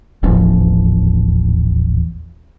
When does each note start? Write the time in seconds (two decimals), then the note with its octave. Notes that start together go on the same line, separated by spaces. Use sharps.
0.23 D#1 A1 E2 F3